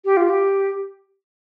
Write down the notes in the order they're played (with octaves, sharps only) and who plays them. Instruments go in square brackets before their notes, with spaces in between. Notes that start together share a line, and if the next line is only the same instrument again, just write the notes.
[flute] G4
F4
G4